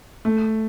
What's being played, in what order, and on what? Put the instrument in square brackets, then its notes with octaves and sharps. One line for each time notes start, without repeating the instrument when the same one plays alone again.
[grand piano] A3